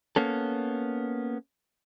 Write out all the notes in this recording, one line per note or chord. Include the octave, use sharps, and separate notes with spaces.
A#3 B3 C#4 A4